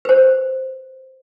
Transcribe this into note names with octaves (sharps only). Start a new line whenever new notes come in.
B4 C5